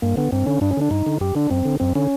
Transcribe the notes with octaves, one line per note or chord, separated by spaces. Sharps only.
G2 A#3
D3 B3
G2 C4
D3 C#4
G2 D4
C#4
D3 D4
G2 D#4
D3
F#2 G4
D3 D4
F#2 C4
D3
F#2 C4
D3 C#4